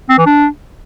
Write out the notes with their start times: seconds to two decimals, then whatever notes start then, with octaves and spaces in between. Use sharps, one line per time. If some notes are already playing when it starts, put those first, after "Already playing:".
0.09 C4
0.18 E3
0.26 D4